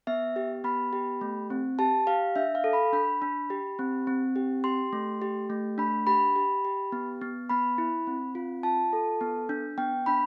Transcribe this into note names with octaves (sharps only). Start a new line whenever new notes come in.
B3 E5
G4
B3 B5
G4
A3
C4
G4 A5
G4 F5
D4 E5
F5
A4
B5
D4 B5
D4
G4
C4
C4
G4
G4 C6
A3
G4
A3
D4 B5
G4 B5
G4
G4
B3
B3
B3 B5
E4
C4
F4
F4 A5
A4
B3
D4
B3 G5
D4 B5